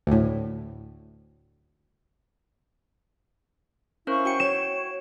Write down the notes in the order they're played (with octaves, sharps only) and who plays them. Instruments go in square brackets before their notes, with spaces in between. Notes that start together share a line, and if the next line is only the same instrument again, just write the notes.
[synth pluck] D2 A2
[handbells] C#4 A#4 C5 [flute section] E4 F5 C#6
[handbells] F#4 G5 C#7
[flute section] C#5 [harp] E7